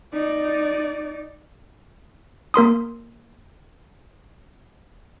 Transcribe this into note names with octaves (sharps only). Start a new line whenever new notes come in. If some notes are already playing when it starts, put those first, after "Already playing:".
D#4 D5
A#3 A#4 C6 D#6